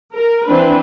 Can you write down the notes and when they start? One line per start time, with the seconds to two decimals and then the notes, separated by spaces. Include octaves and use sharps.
0.10 A#4
0.45 E3 C4 D4 B4